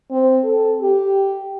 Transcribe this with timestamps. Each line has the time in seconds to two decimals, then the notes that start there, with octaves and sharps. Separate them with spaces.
0.11 C4
0.44 A4
0.82 G4